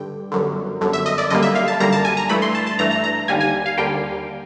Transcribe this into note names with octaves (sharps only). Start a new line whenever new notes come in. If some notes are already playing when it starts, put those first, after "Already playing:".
Already playing: G2 D3 G5
G1 F#2 D3
G1 F#2 D3
E5
D#5
D5
F#2 D3 G3 A#3 D#5
E5
F5
A5
F#2 D3 G3 A#3 A#5
A5
G#5
A#5
G2 E3 A3 B5
C6
A5
A5
G2 E3 A3 A#5
A#5
A#5
D#2 D3 G3 A#3 G#5
G#5
F5
D#2 D3 G3 A#3 G5